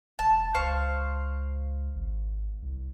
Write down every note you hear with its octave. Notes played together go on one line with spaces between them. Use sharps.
E1 A5
C#2 C5 F5 C#6
G#1
C2